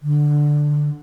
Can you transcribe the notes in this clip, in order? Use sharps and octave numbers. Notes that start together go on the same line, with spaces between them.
D3